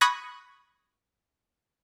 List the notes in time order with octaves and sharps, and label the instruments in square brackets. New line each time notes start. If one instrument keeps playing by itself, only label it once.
[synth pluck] B5 C#6 D#6 F#6 G#6 A#6